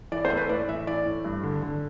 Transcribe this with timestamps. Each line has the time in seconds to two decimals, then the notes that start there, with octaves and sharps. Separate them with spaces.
0.12 E3 D5
0.25 C5
0.31 A2 A4
0.37 B4
0.49 A2 D5
0.68 E3 E5
0.87 E3 D5
1.06 A2
1.25 G2
1.43 D3
1.62 D3